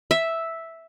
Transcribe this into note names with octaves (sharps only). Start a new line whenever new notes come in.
E5